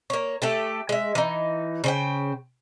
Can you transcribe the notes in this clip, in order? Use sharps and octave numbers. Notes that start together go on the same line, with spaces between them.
A#3 C#5
A3 G4 A4
G#3 E5
E3 D#4
C#3 C5 G5